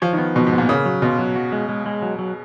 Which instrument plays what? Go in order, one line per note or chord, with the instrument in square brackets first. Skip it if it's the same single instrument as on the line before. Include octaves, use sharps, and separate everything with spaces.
[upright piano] F3 [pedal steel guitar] C#5
[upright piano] D#3
[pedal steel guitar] B3
[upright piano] B2 [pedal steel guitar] F3
[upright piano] G#2
[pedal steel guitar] B3
[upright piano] A#2
[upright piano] C#3 [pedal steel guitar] A#3
[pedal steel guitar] F#3
[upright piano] B2 [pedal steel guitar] F4
[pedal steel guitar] F#3
F#4
G#3
G#3
G#3
F#3
F#3